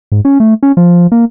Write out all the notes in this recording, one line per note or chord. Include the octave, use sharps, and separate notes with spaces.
G#2
C#4
A3
C#4
F3
A#3